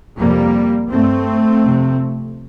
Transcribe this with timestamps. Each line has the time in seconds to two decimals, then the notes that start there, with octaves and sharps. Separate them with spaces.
0.18 F2 C3 G3 A#3
0.91 G2 A3 C4
1.64 F2 C3